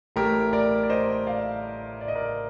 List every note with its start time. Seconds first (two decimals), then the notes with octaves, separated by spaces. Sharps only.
0.16 A1 A2 A3 G4 A#4
0.53 A#4 D5
0.83 D5
0.90 C5 D#5
1.27 D5 F5
2.01 D5
2.08 D#5
2.15 A#4 D5